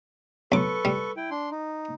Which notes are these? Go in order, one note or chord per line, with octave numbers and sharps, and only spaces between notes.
B1 A4 B4 C#6 D6
G3
E4 G5
D4 C6
D#4